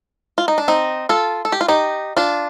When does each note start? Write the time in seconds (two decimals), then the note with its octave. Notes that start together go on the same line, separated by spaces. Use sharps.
0.38 F4
0.48 D#4
0.58 D4
0.68 C4 D#4
1.09 F4 A4
1.45 A4
1.52 G4
1.61 F4
1.68 D#4 G4
2.17 D4 F4